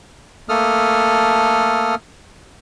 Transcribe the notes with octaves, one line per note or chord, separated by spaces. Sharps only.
A3 A#3 A4 D#6 F6